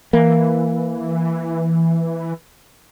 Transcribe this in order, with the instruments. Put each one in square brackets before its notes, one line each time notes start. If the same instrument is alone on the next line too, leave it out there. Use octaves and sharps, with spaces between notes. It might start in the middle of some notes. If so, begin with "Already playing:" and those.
[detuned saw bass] E3 [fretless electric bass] A#3